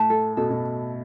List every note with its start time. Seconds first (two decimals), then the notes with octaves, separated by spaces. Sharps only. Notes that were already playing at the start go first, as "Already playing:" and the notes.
Already playing: A2 A5
0.10 A4
0.37 B2 A4
0.50 B2